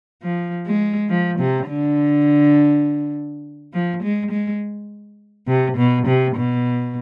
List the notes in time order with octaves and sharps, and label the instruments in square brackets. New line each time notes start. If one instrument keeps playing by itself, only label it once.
[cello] F3
G#3
F3
C3
D3
F3
G#3
G#3
C3
B2
C3
B2